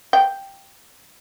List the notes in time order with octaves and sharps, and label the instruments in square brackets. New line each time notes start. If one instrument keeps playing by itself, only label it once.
[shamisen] G5